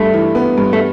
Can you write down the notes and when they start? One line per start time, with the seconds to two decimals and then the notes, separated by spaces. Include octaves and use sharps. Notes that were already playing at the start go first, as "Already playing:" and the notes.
Already playing: G2 A3
0.14 E3
0.35 B3
0.58 G2
0.73 A3